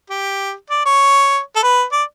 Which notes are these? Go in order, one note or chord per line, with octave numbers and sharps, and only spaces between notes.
G4
D5
C#5
A4
B4
D5